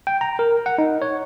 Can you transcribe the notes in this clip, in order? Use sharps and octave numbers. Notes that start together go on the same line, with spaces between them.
G5
A#5
A#4
F#5
D#4
C#5